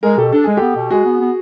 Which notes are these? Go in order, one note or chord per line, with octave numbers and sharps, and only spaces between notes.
G#3 G#4 A#4
B2 G4 A4
D4 A4
G#3 G#4
B3 G4 A4
B2
G#3 F#4 G#4
B3
B3